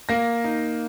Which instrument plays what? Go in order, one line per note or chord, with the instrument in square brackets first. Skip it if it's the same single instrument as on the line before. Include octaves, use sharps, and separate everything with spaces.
[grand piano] A#3 A#6
D#4